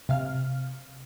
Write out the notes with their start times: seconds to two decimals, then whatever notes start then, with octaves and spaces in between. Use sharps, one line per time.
0.09 C3 F5 F6